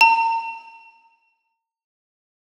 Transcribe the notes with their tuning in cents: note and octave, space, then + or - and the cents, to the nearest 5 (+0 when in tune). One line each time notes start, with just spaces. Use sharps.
A#5 -40